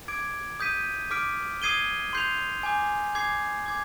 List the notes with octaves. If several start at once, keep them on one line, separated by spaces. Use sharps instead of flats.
D6 G#6 D7
D#6 G6 B6 D#7
D6 F6 B6 D7
D#6 G#6 C7 D#7 G7
C6 G6 C7 F7
G#5 D6 G6
D6 G#6 C7
D6 G#6